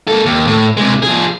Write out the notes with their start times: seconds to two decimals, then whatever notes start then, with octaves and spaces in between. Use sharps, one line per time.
0.08 A#3 A4
0.25 D#2
0.47 A2
0.77 C3 G#3
1.02 F3 G#4